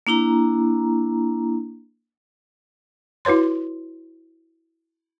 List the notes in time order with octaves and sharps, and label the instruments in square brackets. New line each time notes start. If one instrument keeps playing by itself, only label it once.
[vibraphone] A#3 D4 E4 A#5
[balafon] E4 F#4 B4 C#5 C6